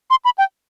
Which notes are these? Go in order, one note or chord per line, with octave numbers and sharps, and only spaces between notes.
C6
B5
G5